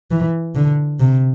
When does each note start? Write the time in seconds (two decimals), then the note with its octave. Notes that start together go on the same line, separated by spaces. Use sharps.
0.11 E3
0.55 D3
1.00 C3